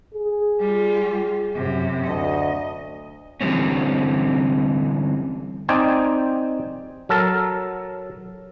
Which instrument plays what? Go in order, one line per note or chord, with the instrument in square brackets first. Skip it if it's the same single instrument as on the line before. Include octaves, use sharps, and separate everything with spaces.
[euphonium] G#4
[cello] G3 F4
F#2 C3
[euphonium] D2 [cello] D#5
[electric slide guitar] D3 E3 G3 C4 C#4
[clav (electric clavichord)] C4 D#4 D5 G5 G#5
F#3 A4 A#4 A5